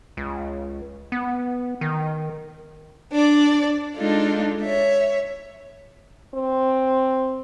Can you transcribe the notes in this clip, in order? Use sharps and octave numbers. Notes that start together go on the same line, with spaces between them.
C#2
B3
D#3
D4 D5
G#3 D4 D#4 F4 A4
C#5 E5
C4